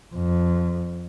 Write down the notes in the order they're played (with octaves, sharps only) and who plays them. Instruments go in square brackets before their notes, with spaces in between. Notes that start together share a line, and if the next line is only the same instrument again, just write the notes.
[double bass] F2